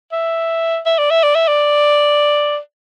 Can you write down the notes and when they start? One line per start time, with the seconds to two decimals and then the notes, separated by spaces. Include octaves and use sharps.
0.12 E5
0.86 E5
0.98 D5
1.10 E5
1.23 D5
1.35 E5
1.47 D5